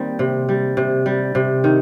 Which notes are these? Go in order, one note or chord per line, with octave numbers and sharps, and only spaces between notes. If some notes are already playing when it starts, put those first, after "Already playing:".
Already playing: D#3 G3 A#3 C4
C3
G3
C3
G3
C3
D#3